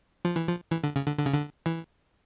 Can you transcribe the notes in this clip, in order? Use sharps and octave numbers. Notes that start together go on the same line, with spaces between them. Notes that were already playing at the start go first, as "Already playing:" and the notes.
F3
E3
F3
E3
D3
C#3
D3
D3
C#3
D3
E3